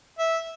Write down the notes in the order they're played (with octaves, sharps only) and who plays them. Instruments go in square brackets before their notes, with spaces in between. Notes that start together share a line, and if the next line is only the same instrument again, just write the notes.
[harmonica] E5